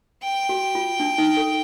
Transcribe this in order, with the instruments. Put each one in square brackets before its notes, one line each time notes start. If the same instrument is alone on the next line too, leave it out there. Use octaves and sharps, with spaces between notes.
[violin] G5
[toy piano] F#4
F4
D4
D#4
A4